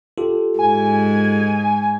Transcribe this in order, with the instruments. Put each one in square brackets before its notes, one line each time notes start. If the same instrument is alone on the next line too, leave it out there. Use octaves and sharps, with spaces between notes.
[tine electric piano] F4 G4 A4
[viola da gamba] G#2 [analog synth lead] G#5